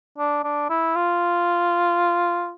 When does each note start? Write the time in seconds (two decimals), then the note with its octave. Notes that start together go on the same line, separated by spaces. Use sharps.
0.18 D4
0.44 D4
0.70 E4
0.96 F4